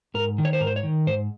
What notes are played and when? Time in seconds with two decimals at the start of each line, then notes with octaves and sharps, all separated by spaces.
0.14 G#2 A#4
0.38 D#3
0.45 C#5
0.53 C5
0.60 G#2 A#4
0.67 C5
0.76 C#5
0.83 D#3
1.07 G#2 C5